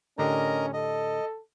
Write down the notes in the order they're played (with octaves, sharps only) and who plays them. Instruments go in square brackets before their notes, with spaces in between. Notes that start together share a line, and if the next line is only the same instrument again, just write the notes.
[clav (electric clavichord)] A2 D3 G4 [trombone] C#4 [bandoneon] A#4 D#5 A#5
[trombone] A4 [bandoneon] D#5